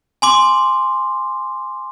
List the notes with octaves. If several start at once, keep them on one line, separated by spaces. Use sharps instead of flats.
G#5 C6 D6